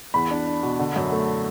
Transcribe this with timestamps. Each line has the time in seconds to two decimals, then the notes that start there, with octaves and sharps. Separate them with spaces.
0.14 E2 B5
0.31 D4
0.47 D4
0.63 B2
0.79 D3
0.96 F#2
1.12 A3